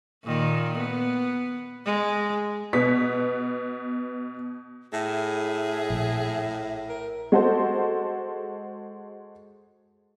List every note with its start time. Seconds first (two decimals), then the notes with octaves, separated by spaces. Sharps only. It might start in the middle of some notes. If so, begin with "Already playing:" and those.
0.24 A#2 D#3
0.78 B3
1.86 G#3
2.73 B2 B3 B6
4.93 A2 G#4 E5
5.90 A#1
6.89 A#4
7.32 G#3 F#4 A4 C5